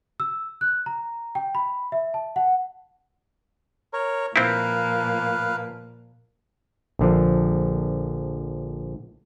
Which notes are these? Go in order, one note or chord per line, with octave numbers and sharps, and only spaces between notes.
E6
F#6
A#5
G5
B5
E5
A5
F#5
A#4 C#5
A#2 F3 A#3 C4 E4 B4 F5
A#1 D3 F3